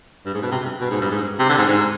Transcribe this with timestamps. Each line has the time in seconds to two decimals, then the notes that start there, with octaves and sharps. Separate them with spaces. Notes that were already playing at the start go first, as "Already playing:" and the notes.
0.26 G2
0.34 G#2
0.42 B2
0.52 C3
0.65 G2
0.80 B2
0.90 G#2
1.01 G2
1.12 G#2
1.39 C3
1.50 D3
1.58 G#2
1.69 G#2